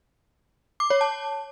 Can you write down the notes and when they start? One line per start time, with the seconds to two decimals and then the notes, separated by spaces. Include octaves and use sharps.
0.80 D6
0.90 C#5
1.01 A5